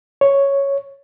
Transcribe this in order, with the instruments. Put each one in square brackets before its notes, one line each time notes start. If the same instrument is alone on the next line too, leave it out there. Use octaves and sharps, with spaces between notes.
[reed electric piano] C#5